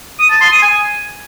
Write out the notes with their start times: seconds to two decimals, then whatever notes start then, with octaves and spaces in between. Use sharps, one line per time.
0.20 D#6
0.30 A5
0.41 C6
0.52 D#6
0.63 G#5